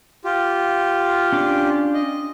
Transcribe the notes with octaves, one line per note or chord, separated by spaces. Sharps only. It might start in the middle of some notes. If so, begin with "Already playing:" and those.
F4 G4
C#4 D4 D6
D#5